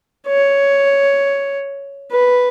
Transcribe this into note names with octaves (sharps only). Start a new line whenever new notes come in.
C#5
B4